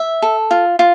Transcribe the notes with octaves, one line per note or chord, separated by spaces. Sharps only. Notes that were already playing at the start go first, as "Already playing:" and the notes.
Already playing: E5
A4
F4
F4